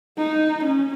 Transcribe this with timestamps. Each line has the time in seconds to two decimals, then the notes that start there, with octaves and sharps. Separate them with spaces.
0.18 D#4
0.64 C#4